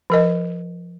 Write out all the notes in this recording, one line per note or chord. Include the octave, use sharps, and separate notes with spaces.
F3 A#4 D#5